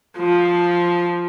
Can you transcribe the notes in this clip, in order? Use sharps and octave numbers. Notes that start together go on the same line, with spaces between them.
F3